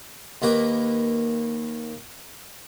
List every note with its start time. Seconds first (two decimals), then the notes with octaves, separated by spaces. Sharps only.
0.42 D#2 A#3 B4 D6